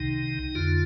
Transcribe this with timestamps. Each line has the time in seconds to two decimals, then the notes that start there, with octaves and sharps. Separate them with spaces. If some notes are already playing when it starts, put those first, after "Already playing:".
Already playing: C2 C3 D#3 D#4
0.55 F2 D3 F4